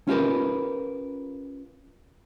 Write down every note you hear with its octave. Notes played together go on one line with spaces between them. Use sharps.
C#4 F4 G4 A#4 B4